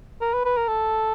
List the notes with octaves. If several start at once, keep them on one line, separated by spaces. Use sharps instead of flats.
A#4
B4
B4
A#4
A4